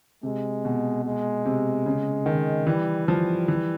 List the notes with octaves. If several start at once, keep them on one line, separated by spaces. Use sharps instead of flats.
C3 G#3
B2
G#3
C3
C#3
D#3
E3 G3
F3 G3
E3